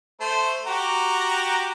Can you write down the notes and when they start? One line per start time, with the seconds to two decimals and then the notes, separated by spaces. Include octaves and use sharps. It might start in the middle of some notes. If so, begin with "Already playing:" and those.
0.20 A3 C5
0.66 F#4 G4 A#5